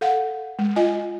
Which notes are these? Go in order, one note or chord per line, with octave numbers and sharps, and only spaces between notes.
A4 F5 F#5
G#3
F4 D#5 G#5